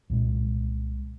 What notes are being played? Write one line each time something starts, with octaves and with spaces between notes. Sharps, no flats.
C2 A#2 G#3